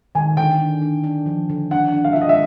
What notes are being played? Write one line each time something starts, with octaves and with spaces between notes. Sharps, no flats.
D#3 G#5
D3 G5
D4
D4
D4
F3
D3
D4 F#5
D4
F5
F4 E5
D#5
E5